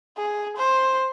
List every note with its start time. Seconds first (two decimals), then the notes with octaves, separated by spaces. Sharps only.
0.17 G#4
0.56 C5